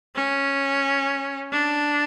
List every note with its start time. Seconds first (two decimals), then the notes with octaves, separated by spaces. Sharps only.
0.16 C#4
1.52 D4